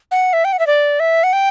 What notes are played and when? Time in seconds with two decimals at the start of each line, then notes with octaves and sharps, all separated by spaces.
0.11 F#5
0.33 E5
0.45 G5
0.53 F#5
0.59 E5
0.67 D5
1.00 E5
1.23 F#5
1.33 G5